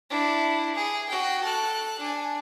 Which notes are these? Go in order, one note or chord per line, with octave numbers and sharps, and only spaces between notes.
D4 E4
G#4
F#4 G5
A4 F#6
D4 G#5